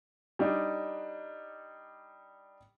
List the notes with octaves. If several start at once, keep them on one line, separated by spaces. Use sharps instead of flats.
G3 D4 D#4